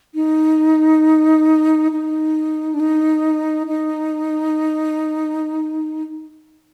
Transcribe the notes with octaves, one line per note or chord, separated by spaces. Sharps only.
D#4
D#4
D4
D#4
D#4